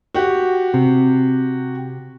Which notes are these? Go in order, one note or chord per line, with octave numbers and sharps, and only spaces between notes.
F#4 G4
C3